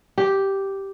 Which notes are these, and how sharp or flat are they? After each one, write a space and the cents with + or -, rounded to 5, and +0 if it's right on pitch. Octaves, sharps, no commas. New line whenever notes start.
G4 -5